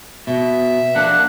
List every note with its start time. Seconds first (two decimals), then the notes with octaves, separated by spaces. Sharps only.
0.27 B2 E5
0.95 A#3 D4 F#5